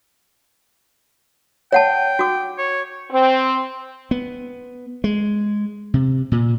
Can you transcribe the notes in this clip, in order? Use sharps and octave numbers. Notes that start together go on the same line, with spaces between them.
C#5 F#5 G5 A5
F#4 D6
C#5
C4
B3
G#3
C3
A#2